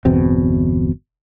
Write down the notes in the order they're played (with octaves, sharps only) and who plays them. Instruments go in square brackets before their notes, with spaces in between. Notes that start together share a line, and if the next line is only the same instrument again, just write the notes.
[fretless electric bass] G1 E2 B2 C4